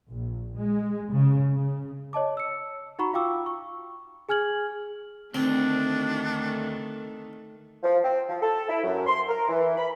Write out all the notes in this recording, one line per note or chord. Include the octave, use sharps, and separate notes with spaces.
A#1
G#3
C#3
C#3
C#5 D#5 A5 D6
E6 C#7
D#4 F#4 F#5 A#5 B5 C#6
F4 F5 G5 D6 E6
C#6
G#4 G#5 F6 G#6 F#7
D2 D#3 A3 C4 D4
F3
C4
F3
A4
E4
F#2
C6
A#4
E3
B5